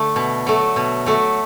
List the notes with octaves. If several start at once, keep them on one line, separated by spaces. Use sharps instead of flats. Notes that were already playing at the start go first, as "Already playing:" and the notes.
Already playing: D3 A3
B2
F#3 A3
B2
F#3 A3